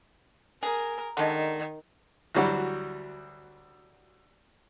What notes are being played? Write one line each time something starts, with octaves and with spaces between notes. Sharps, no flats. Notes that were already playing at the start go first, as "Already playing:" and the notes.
G#4 A#4
D3 D#3 G#3
D2 E3 F#3 G3 F#4